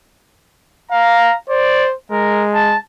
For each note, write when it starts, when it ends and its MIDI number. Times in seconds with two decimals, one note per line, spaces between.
0.91 1.35 77
0.91 1.36 82
1.49 1.94 72
1.49 1.87 74
2.12 2.75 56
2.12 2.44 70
2.54 2.77 81